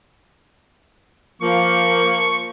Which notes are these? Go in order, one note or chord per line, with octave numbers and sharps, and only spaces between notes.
F3 A#3 C#6